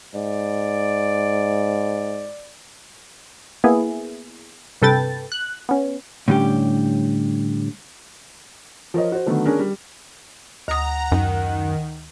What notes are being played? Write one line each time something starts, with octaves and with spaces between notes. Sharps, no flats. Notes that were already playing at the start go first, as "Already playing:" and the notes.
G#2 D5
A#3 B3 E4 G#4
G2 C3 A4 B4 G5 A6
F#6
B3 C#4
A2 D3 G3 C#4 G4
F3 A#4 C#5 D#5
F#4 C5
D3 D#3 F#3 A3 B3
C#4 D4 G#4 A#4
G3
D2 F#5 A#5 D#6
F#2 D#3